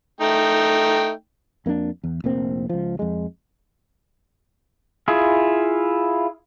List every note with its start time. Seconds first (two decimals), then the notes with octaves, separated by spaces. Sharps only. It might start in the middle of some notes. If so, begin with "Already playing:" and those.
0.21 A3 D#4 G5
1.66 F2 A#3 B3 D4
2.04 E2
2.24 F1 A#1 A#3 C4
2.70 C#2 F3
2.99 F2 G#3
5.08 E4 F4 G#4